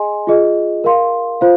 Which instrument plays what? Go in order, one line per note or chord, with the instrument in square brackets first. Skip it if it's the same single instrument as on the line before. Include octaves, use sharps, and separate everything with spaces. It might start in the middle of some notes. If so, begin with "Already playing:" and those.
Already playing: [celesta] G#4 D#5 G#5 C6
F4 G#4 D#5
A#4 F5 C6
F4 C5 F5